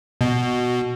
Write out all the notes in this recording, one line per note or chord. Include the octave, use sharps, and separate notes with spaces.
B2